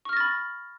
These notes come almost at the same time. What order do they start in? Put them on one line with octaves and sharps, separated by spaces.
C#6 F6 A#6 A6 B5